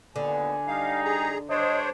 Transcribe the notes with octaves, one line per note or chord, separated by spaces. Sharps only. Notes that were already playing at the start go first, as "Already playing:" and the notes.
D#2 A#2 D3 B3 G#5
G3 D#4 F5
G#4 A#5
G2 D4 C5 C#5 D#5